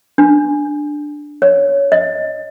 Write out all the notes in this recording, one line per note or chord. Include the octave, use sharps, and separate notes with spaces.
D4
C#5
D#5